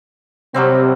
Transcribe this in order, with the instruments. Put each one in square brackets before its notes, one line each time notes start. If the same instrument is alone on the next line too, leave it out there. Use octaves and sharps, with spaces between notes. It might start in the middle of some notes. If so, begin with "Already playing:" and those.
[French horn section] C3 [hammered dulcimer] F#3 G3 C4